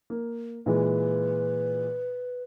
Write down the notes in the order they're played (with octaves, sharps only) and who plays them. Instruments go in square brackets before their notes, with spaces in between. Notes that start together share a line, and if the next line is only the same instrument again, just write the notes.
[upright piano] A#3
[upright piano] A#2 E3 G#3 [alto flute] B4